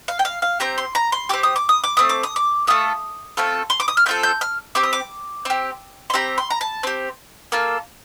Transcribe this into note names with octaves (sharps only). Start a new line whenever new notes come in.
F5
G5
F5
F5
C4 G4 A#5
C6
A#5
C6
C4 G4 D6
D#6
D6
D#6
D6
A3 C4 D#6
D6
D#6
D6
A3 C4 F4 A4 D#6
A3 C4 F4 A4
C6
D6
D#6
F6
A3 C4 F4 A4 G6
G6
F6
C4 G4 D6
D#6
D6
C4 G4
C6
C4 G4 A#5
C6
A#5
A5
C4 G4
A#3 F4 A4